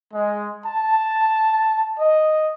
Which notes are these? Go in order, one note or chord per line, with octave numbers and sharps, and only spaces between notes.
G#3
A5
D#5